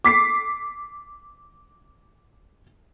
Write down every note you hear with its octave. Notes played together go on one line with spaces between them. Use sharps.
D6 B6 C7